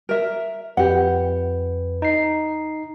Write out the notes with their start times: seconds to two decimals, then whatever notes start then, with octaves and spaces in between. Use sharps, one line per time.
0.09 A#4 E5
0.77 F2 G4 B4 F#5
2.02 D#4 C7